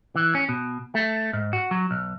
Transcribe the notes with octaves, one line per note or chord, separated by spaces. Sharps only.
E3
C#4
B2
A3
G#2
F#4
F#3
B1